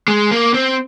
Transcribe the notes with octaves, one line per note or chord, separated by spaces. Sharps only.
G#3
A#3
C4